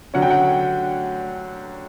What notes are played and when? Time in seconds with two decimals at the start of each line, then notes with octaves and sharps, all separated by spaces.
0.14 D3 F#3 C#4 F#5
0.22 G5
0.30 F#5